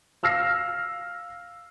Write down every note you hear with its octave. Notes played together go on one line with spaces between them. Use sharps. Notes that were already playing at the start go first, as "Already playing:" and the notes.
F5 E6 F6 A#6 C7